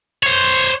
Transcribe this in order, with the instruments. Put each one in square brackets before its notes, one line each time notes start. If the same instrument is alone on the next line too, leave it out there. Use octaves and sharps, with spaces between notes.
[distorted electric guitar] C5 C#5